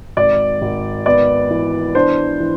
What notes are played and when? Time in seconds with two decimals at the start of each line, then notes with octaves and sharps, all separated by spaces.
0.17 G#1 D5
0.61 G#1
1.06 B3 D5
1.50 E3
1.95 D4 C5
2.40 E3